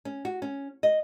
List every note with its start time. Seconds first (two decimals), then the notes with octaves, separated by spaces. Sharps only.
0.05 C#4
0.25 F#4
0.42 C#4
0.83 D#5